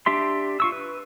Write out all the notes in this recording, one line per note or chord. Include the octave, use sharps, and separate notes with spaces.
D4 G4 E5 C6
F4 C#6 E6
B4